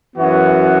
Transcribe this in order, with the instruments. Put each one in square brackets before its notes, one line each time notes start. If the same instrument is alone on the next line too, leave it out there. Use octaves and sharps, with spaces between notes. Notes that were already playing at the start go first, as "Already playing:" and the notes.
[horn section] F#2 E3 B3 F#4